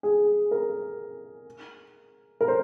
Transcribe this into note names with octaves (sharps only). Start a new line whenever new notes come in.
G#4
A#4
A#4
C5